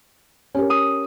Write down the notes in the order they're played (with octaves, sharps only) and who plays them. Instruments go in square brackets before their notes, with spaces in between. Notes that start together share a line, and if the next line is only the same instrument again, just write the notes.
[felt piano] C#4 G4 A#4
[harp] D#6